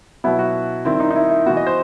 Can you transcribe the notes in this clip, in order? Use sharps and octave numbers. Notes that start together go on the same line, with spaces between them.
B2 F#3 B3 E4
F#4
D#3 G3 C4 E4
D#4
D#4
E4
E4
E3 B3 F#4
D#5
C5